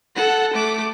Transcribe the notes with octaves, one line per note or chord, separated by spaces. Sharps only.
A4 F#5
A3 D6